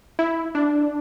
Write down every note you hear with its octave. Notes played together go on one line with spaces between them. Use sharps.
E4
D4